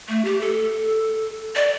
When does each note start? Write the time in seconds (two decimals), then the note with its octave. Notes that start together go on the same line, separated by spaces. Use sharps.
0.08 A3
0.25 G4
0.41 A4
1.55 D5